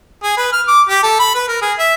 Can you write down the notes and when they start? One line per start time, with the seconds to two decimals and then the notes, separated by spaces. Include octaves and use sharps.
0.23 G#4
0.37 B4
0.53 F6
0.67 D6
0.89 G4
1.03 A4
1.19 B5
1.35 B4
1.48 A#4
1.62 G#4
1.79 E5